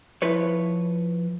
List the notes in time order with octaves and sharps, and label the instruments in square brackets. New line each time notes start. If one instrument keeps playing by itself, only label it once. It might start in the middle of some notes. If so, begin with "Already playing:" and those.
[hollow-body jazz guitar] F3 E4 B4 C#5